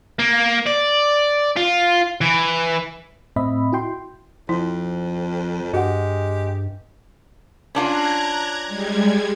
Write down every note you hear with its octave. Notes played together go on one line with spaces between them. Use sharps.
A#3
D5
F4
E3
A2 C4 D#5 E5 B5
E4 F#4 G5 C6
F2 F3 E4
G2 G#3 F#4 G4 F#5
C#4 D4 F4 A#5 F#6 G#6
G3 G#3 G#6